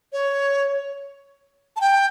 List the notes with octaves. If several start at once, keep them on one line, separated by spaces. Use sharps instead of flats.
C#5
A5
G5